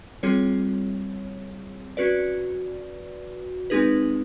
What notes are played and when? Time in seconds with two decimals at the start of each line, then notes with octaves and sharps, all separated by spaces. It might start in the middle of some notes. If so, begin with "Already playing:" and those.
0.23 G3 C4 F4 G#4 C#5
1.97 C#4 F#4 B4 D5
3.70 G#3 C4 D#4 G#4 B4